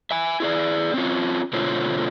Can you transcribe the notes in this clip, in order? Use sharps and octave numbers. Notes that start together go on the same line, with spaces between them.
E5 G#5
E4 G#4 D5
C4 C#4 F4
B2 D3 A3 C4 F4 C#5